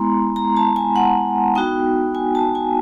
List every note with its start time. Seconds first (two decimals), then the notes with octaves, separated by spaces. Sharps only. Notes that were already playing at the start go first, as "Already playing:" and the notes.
Already playing: G#3 B3 E4 A#5 C6
0.36 A#5
0.57 A5
0.76 G#5
0.96 F#5
1.55 B3 D#4 F#4 G5
2.15 G#5
2.35 A5
2.55 G#5